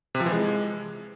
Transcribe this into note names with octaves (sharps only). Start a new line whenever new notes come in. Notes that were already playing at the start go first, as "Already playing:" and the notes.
C3
F3
E3
G#3